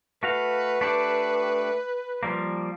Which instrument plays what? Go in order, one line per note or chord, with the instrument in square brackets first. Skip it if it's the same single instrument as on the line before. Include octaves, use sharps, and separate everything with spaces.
[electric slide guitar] A3 F#4 F5 [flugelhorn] B4
[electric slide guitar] A3 D4 G4
F3 G3 A#3